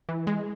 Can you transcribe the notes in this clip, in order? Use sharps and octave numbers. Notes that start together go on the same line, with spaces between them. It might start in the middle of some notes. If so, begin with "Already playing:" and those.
E3
G#3